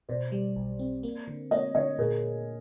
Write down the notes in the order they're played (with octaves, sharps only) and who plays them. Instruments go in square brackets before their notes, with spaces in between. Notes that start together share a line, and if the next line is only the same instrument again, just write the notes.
[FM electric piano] B2 [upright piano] C5 D5
[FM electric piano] G3
B1
C4
A#3
D3
[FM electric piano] A#3 [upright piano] C#5 D#5
[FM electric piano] D3 [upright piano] C#5 D#5
[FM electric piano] A#2 [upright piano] G#4 A#4